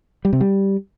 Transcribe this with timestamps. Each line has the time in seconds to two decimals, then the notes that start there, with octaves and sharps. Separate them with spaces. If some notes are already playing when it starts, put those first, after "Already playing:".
0.25 G3
0.33 C3
0.41 G3